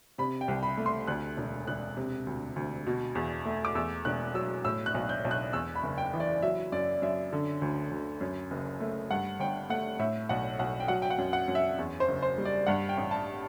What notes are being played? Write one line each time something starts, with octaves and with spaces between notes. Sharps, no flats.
C3 B5
G5
C2
B5
A3
C6
D2 F#6
E1
E1 F#6
C3
D2
D2
B2
E2
A3
D6
E2 E6
E1 F#6
F#3 E6
A2 E6
F#6
B1
G6
B1
F#6
E2 E6
B5
F#1
G5
E3
D5
F#3 E5
F#2 D5
F#2 E5
D3
D2
D2
F#2
F#1
A3
G2 F#5
G1 G5
A3 F#5
A2 E5
B1 F#5
B1 F#5
G5
F#3 F#5
G5
F#5
F#2
F#5
F#2
E5
E2
C5
F#1
C5
G3
D5
G2 F#5
G5
A1
A5